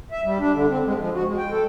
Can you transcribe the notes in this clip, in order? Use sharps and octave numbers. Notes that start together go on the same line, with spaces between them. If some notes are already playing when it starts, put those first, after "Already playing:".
E5
G3
D4
D3
C4
G#3
F3
F#4
G#3
G5
A4